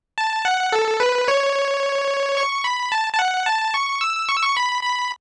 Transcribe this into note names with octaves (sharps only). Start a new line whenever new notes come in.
A5
F#5
A4
B4
C#5
C#6
B5
A5
A5
F#5
A5
C#6
E6
C#6
E6
C#6
B5
B5